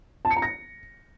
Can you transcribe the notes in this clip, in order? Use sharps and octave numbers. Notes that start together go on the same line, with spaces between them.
A5
C#7
A#5
A#6